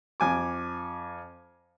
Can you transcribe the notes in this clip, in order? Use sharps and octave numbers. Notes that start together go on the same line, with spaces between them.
F2 G#5 D6